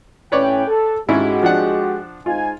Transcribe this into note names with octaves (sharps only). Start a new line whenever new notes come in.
A2 C#4 B4 C#5 D5 G5
A4
G#2 G#3 C#4 E4 F#4 G4
F3 D4 F#5
G#2 D#4 F4 G#5